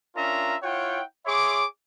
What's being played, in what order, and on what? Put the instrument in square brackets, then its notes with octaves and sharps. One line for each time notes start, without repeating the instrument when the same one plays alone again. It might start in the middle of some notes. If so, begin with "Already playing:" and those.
[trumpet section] C#4 D4 F4 A#4 E5 A#5
E4 F4 C#5 F#5 G5
G#4 C#5 E5 C6 D6